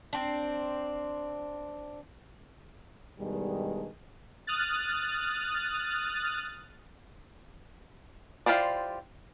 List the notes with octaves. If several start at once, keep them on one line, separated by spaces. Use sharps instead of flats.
C4 D4
G2 B2 D#3 G3 G#3
D#6 F6 F#6 A6
E4 F4 G4 C5 D5